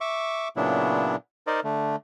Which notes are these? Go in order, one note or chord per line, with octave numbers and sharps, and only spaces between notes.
E5 C#6 D6
A#2 C#3 F#3 B3 D4 E4
D#4 A#4 C5 D5 D#5
D3 A3